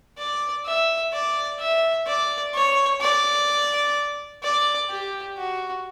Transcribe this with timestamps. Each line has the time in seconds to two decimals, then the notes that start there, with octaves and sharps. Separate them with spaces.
0.18 D5
0.66 E5
1.13 D5
1.60 E5
2.06 D5
2.54 C#5
3.01 D5
4.43 D5
4.89 G4
5.38 F#4